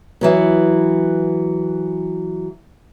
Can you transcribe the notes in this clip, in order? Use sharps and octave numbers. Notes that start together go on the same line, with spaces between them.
E3 F#3 B3